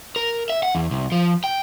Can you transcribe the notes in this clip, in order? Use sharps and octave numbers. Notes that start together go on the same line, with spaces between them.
A#4
E5
F#5
E2
C2
F3
G5